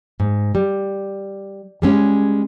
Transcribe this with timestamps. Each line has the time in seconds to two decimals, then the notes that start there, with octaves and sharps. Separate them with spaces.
0.20 G#2
0.55 G3
1.82 G3 G#3 C#4